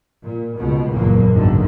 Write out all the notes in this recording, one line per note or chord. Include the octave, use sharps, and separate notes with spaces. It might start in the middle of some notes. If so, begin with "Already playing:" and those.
A#2
C#2 B2
F#1 E2 A#2 E3 A#3
F#1 B1 G#2 D3 D#3 F#3